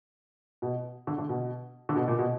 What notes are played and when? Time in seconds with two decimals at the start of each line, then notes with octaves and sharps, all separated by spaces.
0.62 B2
1.07 D3
1.18 D3
1.29 B2
1.89 D3
1.96 B2
2.08 A#2
2.18 B2